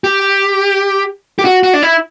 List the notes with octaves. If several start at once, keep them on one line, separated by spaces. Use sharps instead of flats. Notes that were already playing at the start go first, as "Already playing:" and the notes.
G4
G4
F#4
F#4
D4
E4